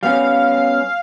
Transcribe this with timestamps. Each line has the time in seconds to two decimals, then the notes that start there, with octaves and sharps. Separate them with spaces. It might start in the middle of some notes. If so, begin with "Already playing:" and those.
0.03 G3 B3 C#4 F5